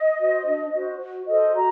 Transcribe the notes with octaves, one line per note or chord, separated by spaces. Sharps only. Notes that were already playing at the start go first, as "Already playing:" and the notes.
Already playing: D#5
F#4 C5
D4
F#4 C5
F#4
A4 C5 D#5
F#4 A#5